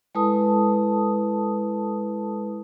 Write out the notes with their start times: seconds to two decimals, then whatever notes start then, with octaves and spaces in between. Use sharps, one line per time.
0.15 G#3 E4 A4 B4 A5 D#6